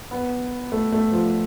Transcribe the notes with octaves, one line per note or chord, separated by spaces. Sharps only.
B3
A3
A3
F3